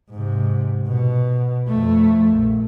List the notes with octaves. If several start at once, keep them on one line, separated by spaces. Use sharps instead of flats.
G#2 C3
B2
F2 A3
A#1